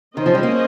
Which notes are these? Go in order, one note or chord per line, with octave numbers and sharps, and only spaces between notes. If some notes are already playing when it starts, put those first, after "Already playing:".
D#3 C#4 G#4 C5 D#5
F3
G3
A#3